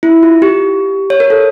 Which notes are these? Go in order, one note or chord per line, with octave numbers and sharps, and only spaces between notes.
E4
F4
G4
C#5
A#4
A4